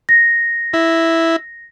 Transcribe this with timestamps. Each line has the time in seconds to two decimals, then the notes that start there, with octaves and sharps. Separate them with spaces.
0.09 A#6
0.73 E4